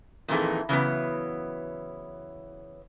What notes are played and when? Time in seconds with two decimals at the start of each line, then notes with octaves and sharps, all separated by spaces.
0.28 F2 A#2 D#3 E3 G#4 A4
0.69 C#3 E3 F#3 B3